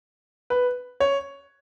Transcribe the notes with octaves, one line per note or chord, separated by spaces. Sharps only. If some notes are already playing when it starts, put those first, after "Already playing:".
B4
C#5